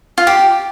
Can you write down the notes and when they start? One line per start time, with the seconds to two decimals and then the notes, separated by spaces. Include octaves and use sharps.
0.18 F4
0.27 G4